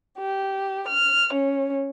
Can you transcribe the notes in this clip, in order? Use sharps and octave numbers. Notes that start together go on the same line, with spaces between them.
G4
F6
C#4